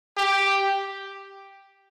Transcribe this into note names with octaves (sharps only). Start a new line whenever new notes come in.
G4